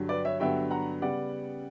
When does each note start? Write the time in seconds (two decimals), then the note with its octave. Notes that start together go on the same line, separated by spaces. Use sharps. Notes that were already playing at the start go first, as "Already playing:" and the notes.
Already playing: G2 D3 F#3
0.09 B4 D5
0.25 C#5 E5
0.40 G2 D3 F#3 B3 E5 G5
0.71 F#5 A#5
1.02 C#3 G3 B3 D5 F#5